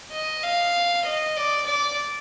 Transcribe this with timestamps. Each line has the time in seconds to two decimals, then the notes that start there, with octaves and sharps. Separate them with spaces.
0.12 D#5
0.43 F5
1.06 D#5
1.37 D5
1.68 D5